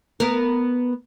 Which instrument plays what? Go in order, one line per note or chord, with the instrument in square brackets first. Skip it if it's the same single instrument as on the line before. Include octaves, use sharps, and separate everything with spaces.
[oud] B3 A#4